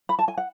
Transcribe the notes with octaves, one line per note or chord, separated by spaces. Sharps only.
B5
A5
G#5
F#5